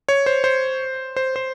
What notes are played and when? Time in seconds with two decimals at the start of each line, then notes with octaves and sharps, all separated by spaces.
0.09 C#5
0.26 C5
0.44 C5
1.16 C5
1.36 C5